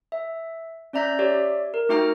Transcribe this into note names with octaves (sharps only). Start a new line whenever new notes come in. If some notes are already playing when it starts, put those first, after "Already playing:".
E5
C#4 D5 E5 A#5 G6 B6
G4 C#5 D5 E5
A#4
A3 D#4 F#4 G5 A#5 F6